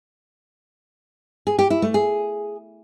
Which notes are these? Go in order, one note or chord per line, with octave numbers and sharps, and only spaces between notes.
G#4
G4
E4
A3
G#4